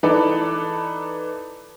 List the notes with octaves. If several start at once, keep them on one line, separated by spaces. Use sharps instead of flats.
E3 D#4 A4 B4 D5